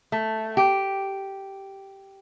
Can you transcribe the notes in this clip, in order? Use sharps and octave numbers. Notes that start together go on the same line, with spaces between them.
A3
G4